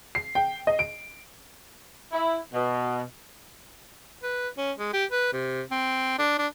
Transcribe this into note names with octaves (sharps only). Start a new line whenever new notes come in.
C7
G5
D#5
D7
E4
B2
B4
C#4
G#3
G4
B4
C3
C4
D4
D4